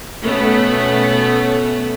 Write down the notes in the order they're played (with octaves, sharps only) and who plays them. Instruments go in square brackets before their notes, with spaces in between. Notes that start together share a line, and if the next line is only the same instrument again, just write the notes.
[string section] B2 A3 B3 C#4